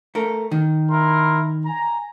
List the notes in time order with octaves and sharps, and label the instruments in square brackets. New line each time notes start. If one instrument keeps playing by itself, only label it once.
[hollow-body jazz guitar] A3 A#4
D#3
[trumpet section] E4 A#4 C6
G#5 A#5